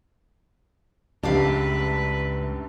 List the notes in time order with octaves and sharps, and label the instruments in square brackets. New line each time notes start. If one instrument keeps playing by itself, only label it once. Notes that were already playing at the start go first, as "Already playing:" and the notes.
[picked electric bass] C#2 [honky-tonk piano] F#2 A2 D4 [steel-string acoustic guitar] G4 F5 [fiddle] B4